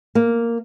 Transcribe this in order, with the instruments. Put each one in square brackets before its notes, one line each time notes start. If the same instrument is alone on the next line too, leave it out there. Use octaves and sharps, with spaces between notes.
[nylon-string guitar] A#3